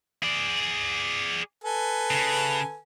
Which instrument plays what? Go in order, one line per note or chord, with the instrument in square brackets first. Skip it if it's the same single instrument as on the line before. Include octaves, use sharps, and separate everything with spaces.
[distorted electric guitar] G#4 D5
[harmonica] A4 B4 G#5
[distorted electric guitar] C#3